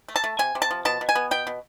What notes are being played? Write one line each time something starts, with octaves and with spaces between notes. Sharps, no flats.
A3
A5
A3
C3 G#5
C3
A5
F3
B2 A5
B2
G#5
B3
B2 G5
B2